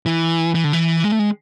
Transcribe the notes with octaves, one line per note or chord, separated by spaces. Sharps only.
E3
E3
D3
E3
G#3
A3
G#3